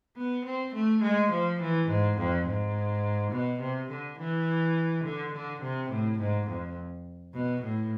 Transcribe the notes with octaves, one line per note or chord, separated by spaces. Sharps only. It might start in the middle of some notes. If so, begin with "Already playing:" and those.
B3
C4
A3
G#3
F3
E3
G#2
F2
G#2
B2
C3
D3
E3
D3
D3
C3
A2
G#2
F2
B2
A2